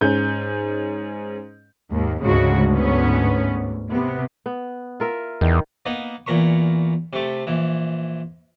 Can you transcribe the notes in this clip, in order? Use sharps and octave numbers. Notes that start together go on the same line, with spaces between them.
G#2 C#4 G6
D#2 G#2
D2 G#2 C#3 G#3 F#4
B3 C#4
C3 B3
B3
F4 A#4 E5
E2 D#3
A#3 B3 D#4
E2 A#2 A#4 B5 C#6
C3 A3
A#1 E3